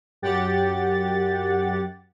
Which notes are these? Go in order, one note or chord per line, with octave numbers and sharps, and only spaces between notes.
F#2 G4 F#5 A6